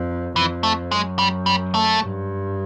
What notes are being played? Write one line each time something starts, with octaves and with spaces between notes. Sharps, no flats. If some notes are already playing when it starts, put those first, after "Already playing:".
Already playing: F2
F2 E3
A3
F#2 G#3
G3
G3
A3
G2